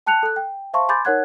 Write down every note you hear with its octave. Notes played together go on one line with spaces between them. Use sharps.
G5 A5 F#6 C#7 F7
A4 F#6
G5
C5 E5 F5 A5 C6 C#6
G#5 B5 C6 D6 G6 A6
D#4 A#4 C#5 F#5 F#6 G#6